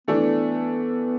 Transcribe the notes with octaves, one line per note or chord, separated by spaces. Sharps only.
E3 A3 B3 D4